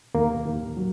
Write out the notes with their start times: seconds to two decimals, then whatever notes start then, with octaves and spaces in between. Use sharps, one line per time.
0.14 D#2 A#3
0.46 D#2
0.77 F#3